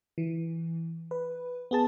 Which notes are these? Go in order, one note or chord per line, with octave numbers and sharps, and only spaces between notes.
E3
B4
B3 G#4 A5